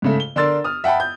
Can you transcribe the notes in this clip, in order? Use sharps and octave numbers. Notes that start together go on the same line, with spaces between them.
G#2 C#3 A3
G7
D3 D4 A#4 C6 E6 A6
D#6 F6
E5 F#5 G5 A5 B5
G6